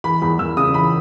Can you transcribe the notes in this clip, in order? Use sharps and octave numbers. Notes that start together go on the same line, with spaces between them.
E3 B5
E2 B5
E2 E6
C#3 D#6
E3 B5